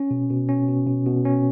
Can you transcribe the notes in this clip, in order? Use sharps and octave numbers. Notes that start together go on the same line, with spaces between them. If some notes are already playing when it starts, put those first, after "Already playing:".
Already playing: C#4
B2
B2
C#4
B2
B2
B2
C#4